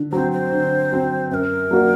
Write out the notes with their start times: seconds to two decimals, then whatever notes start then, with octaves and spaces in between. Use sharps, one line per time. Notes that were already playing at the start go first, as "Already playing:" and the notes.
Already playing: D3
0.12 F#3 C4 C5
0.32 C5
0.52 D3
0.92 F#3 C4
1.31 F#2 A#4 C5
1.71 F#3 A#3 D4 F#4